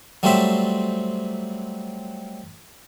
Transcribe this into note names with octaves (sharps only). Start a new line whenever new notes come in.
F#3 G3 A3 C4 C5 E5